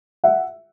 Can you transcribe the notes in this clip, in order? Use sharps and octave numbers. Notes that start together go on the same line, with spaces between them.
E5 F#5